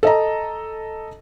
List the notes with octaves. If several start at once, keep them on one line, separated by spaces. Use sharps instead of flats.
A4 D#5 A#5